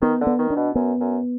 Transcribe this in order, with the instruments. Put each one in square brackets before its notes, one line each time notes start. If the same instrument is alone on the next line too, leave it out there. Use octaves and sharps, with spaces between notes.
[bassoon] D#3 [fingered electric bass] B3
[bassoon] D3
[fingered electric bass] B3
[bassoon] D#3
[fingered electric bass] D4
[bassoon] B2
[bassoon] F#2 [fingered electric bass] B3
[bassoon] F#2